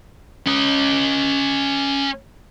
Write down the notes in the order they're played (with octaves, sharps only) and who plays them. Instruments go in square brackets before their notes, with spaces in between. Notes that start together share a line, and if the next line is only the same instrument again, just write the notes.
[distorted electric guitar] C#4 D#5